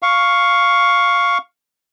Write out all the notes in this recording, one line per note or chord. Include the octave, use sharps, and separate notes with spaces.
F5 C#6